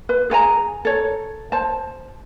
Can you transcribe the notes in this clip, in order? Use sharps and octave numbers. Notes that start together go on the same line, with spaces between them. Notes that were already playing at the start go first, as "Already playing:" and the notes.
B4
G#4 A4 G#5 A#5
A4 C#5
C5 A5